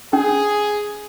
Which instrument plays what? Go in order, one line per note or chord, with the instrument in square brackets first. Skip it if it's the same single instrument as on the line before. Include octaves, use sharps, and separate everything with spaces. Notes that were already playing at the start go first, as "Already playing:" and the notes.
[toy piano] C#4 [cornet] G#4